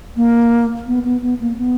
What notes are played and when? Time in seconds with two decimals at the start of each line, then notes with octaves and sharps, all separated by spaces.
0.17 A#3
0.87 B3
1.05 B3
1.22 B3
1.40 A#3
1.58 B3